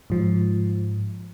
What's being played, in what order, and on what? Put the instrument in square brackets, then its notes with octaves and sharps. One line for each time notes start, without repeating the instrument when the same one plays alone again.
[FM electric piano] G#2 F3